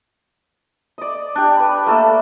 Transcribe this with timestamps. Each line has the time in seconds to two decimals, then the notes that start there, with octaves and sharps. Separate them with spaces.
0.98 D5 D#5
1.35 D4 G4
1.57 B4 B5
1.86 A3 A#3 A4 E5